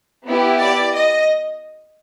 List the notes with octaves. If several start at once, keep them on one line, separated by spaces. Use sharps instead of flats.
B3 E4 G4
D5
D#5